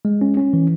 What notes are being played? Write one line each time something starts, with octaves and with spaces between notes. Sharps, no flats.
G#3
C#4
C#4
E3